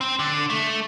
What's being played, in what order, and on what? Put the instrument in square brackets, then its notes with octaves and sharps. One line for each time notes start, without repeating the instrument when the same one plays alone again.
[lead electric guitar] C4
D3
A3